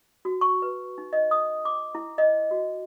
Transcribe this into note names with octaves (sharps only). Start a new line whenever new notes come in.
F#4
C#6
B4
D#4
D#5
D#6
D6
E4
D#5
F#4